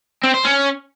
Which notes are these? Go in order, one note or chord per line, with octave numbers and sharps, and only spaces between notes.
C4
C5
C#4